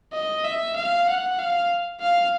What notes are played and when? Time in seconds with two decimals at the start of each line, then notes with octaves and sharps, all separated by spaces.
0.13 D#5
0.44 E5
0.76 F5
1.07 F#5
1.38 F5
2.00 F5